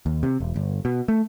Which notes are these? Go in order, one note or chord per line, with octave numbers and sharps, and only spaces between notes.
D#2
C3
E1
G1
B2
A3